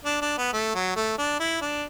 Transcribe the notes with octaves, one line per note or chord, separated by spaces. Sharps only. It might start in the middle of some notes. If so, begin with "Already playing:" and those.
D4
D4
B3
A3
F#3
A3
D4
E4
D4